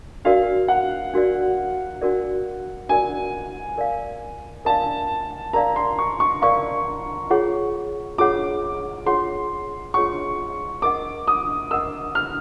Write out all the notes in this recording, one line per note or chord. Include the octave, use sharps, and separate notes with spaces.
D4 F#4 A#4 D5 F5
F#5
D4 F#4 A#4 D5
D4 F#4 A#4 D5
D4 F#4 A#4 D5 G#5
A#4 D5 F5
A#4 D5 F5 A5
A#4 D5 F5 A#5
C6
C#6
C#6
A#4 D5 F5 C#6
F4 G#4 C#5 F#5
F4 G#4 C#5 F#5 D6
F4 G#4 C#5 F#5 C6
F4 G#4 C#5 F#5 C#6
A#4 D#5 F#5 D6
D#6
A#4 D#5 F#5 E6
F6